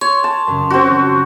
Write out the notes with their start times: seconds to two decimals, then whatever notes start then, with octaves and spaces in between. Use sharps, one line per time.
0.01 C#5 C6
0.24 A5
0.47 F#2 C#3
0.70 C4 F#4
0.90 F3